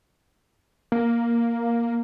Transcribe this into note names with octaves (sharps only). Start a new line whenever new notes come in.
A#3